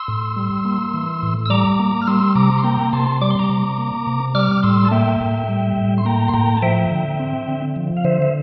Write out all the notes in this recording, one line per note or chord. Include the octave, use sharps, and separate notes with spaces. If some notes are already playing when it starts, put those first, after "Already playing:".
Already playing: C6 E6
A2
G3
A#3
E3
A2
E6
G3 A#5 D6
A#3
F6
G3 C6 E6
C3 A#5 D6
C6
A#3 G5 A#5
C3 A5 C6
G3 D6
C6
A#5 D6
C3
A#3
C3
G3 D6 F6
A2 C6 E6
A5
A#3 E5 G5
A2
G3
A2
C6
A#3 G5 A#5
C6
A2 G5 A#5
A5
F3 E5 G5
D3
C4
D3
F3
F5
D3 C5 E5
E5